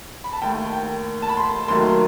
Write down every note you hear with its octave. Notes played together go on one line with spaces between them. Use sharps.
B5
A5
D#2 D#3 A3 G5
G5
A5
B5
C6
D#2 D#3 F#3 A3 C6